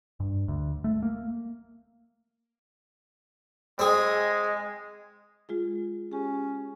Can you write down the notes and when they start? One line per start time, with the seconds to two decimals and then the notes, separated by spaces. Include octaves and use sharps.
0.20 G2
0.48 D2
0.84 A3
1.02 A#3
3.79 G#3 C4 G#4
5.49 G#3 F4 G#4
6.12 C#4 G4 G#4